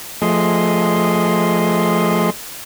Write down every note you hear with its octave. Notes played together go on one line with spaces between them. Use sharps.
F3 A3 G#4 D#5 C6